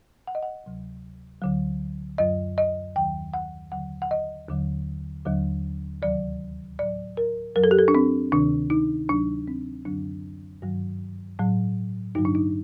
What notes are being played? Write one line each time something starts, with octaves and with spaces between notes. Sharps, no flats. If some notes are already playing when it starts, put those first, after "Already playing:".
F#5
D#5
F#5
D2 C3 F#3
D2 D3 F#3
F#2 F#3 D#5
D#5
D#2 D#3 F#3 G5
F#5
D#2 D3 F#3 F#5
F#5
D#5
D#2 D3 F#3
D#2 D3 F#3
D2 C3 D#3 F#3 D5
A2 F#3 D5
A#4
F#2 F#3 A#4
A4
G4
A4
D4
C4
D2 C3 D#3 D4
D#4
D2 C3 F#3 D4
C4
F#2 D3 F#3 D4
G2 D#3 F#3
A2 F#3
G2 D3 F#3 D#4
D4
D#4